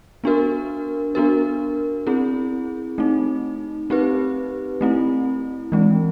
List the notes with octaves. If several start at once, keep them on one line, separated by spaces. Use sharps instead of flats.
B3 D4 F#4 A#4
B3 D4 F#4 A#4
C4 E4 G#4
A3 C4 D#4
C4 D#4 G4 B4
A3 C4 E4
E3 G#3 C4